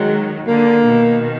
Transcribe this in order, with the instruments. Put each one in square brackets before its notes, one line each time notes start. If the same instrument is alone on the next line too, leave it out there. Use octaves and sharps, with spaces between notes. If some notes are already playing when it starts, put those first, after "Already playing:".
Already playing: [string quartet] D#3 F#3 [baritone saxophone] G#3
[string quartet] D3 [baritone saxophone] A#3
[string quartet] B2 D#3